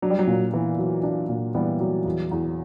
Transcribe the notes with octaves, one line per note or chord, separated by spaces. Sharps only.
F#3 D4
G3
F#3
A#2
E3 B3
F#3
D4
A#2
E3 G3 B3
F#3
E2
E2